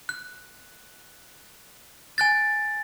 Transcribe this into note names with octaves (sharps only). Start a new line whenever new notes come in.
F#6
G#5 F#6 A6